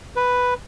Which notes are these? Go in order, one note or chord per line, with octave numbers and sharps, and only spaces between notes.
B4